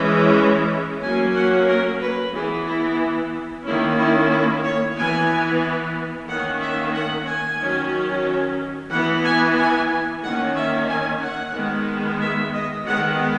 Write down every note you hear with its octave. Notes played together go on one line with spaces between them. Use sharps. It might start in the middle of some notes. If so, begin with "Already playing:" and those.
Already playing: E3 G#3 C#4
F#3 A#3 C#4 G#5
F#5
A#4
B4
E3 B3 G#4
E4
D#3 A#3 C#4 E4
E4
E4
C#5
E3 B3 G#5
D#3 A#3 C#4 F#5
E5
F#5
G#5
D#3 F#3 C#4
E3 B3 F#5
G#5
G#5
D#3 A#3 C#4 F#5
E5
G#5
F#5
D#3 G#3 B3
E5
D#5
D#3 G#3 B3 F#5